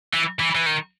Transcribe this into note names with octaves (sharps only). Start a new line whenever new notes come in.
E3
E3
E3
D#3